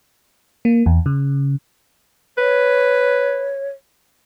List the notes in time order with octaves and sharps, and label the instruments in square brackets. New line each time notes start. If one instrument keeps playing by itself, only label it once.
[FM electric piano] A#3
E2
C#3
[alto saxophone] B4 [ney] C#5